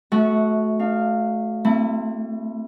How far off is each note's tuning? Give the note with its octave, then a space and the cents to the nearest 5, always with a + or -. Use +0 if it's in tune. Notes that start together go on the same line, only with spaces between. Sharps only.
A3 -20 F#4 -5 E5 -35
D4 +45 F5 +0
A3 +40 C4 +0 E4 -15